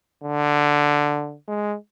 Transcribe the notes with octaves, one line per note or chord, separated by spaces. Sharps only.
D3
G#3